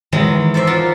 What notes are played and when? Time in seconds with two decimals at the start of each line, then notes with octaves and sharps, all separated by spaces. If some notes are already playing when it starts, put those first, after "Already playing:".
0.12 D#3 E3 F#3 G#3 E4
0.54 A4 C5 D5 E5
0.67 F4 A#4 D5 E5 F#5